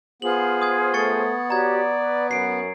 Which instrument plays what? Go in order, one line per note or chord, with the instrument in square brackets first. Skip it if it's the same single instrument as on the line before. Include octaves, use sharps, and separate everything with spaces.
[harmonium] B3 [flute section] F4 G#4 C5 [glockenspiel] F#7
[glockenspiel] D#6 G#6
[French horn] A3 [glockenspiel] C#6 A6 C#7
[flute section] F#4 G4 C#5 [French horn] D5 [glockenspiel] A#5 G#6
[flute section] B4
[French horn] F#2 [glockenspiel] C7 D7